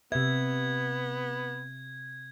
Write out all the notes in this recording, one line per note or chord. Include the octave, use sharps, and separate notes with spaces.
C3 B3 E5 G#6